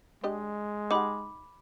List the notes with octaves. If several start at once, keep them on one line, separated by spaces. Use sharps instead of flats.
G#3 D4 G4 D#5
D#4 G4 F#5 B5 D6